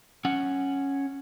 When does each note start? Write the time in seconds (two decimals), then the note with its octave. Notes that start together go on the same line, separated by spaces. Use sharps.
0.25 C#4 F#5